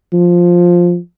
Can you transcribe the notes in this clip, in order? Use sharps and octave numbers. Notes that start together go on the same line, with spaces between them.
F3